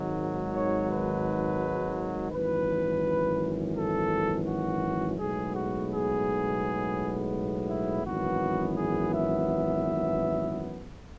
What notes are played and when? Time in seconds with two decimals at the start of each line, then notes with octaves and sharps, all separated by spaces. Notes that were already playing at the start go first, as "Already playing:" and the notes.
Already playing: G#1 G#2 D#3 F#3
0.54 C#5
0.89 B4
2.31 G#1 F#2 E3 B4
3.75 A4
4.46 F#4
5.18 B1 A2 G#3 B3 G#4
5.53 F#4
5.89 G#4
7.68 E4
8.03 G#1 F#2 E3 B3 F#4
8.75 G#4
9.12 E5